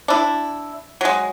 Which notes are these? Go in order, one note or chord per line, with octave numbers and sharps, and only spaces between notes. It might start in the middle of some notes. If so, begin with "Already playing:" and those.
D4 E4
F#3 G#3